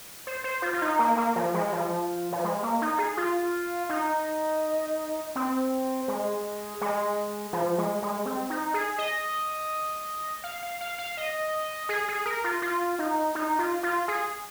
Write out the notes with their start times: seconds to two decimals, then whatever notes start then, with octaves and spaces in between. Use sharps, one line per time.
0.27 C5
0.44 C5
0.62 F4
0.73 F4
0.82 D#4
0.99 A#3
1.17 A#3
1.36 F3
1.54 G#3
1.72 F3
2.32 F3
2.44 G#3
2.63 A#3
2.82 D#4
2.99 G#4
3.17 F4
3.89 D#4
5.36 C4
6.08 G#3
6.81 G#3
7.53 F3
7.78 G#3
8.02 G#3
8.26 C4
8.50 D#4
8.74 G#4
8.98 D#5
10.44 F5
10.63 F5
10.81 F5
10.98 F5
11.17 D#5
11.89 G#4
12.08 G#4
12.26 A#4
12.44 F4
12.62 F4
12.99 D#4
13.35 D#4
13.59 F4
13.83 F4
14.08 G#4